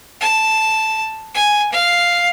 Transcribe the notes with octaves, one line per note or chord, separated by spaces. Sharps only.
A5
G#5
F5